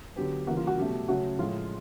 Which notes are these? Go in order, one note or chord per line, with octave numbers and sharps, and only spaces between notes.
D3 F#3 B3 G4
C#3 E3 G3 A#3 F#4
F4
F#4
B2 F#3 A3 G4
C#3 F#3 A3 C#4 F#4
A2 F3 G#3 F4